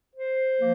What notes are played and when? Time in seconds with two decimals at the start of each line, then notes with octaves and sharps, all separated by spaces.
0.14 C5
0.58 F3 A#3